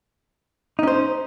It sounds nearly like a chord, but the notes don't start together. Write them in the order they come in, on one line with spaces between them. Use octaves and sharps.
D#4 C#4 C5